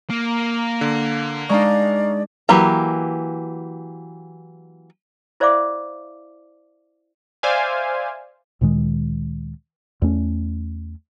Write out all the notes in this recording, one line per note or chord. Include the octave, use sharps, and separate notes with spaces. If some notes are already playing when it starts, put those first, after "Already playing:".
A#3
D3
G#3 D4 D#4 D5 F5 A#5 C#6
E3 F#3 A#3 G4 A#5
E4 C5 D5 E5 F5 D6
C5 D5 E5 F5 G#5
D2 A#2 D#3 G#3
E2 A3 C#4